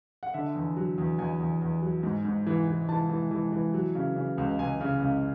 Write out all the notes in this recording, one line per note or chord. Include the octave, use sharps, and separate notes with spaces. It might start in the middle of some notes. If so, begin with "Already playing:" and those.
F#5
D3 E5
E2
F#3
E2
E2 G#5
E2
E2
F#3
G#2
G#2
E3
E3
E3 A5
E3
E3
E3
F#3
C#3
C#3
C#2
C#2 G#5
C#3
C#2